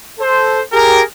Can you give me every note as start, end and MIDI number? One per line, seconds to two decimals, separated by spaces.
0.19 0.61 69
0.19 0.61 72
0.72 1.01 67
0.72 1.01 68
0.72 1.01 70